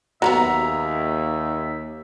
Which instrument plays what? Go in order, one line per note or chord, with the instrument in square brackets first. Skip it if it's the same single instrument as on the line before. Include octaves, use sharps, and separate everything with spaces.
[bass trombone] D#2 [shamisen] F#3 A#3 B3 [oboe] E5 [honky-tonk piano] A#5